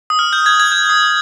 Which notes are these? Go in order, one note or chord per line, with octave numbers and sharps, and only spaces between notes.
D#6
F6
G6
G#6
G#6
G6
D#6